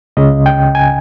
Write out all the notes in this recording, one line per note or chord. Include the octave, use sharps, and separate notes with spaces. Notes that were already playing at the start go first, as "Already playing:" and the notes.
C#2 C#3 D#5
G5
G#5